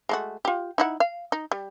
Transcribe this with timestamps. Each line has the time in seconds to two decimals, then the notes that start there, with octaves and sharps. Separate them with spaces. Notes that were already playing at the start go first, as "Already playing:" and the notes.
0.09 G#3 A3 F#4
0.45 F4 G4
0.78 D#4 E4 F#5
1.00 F5
1.32 D#4
1.52 G3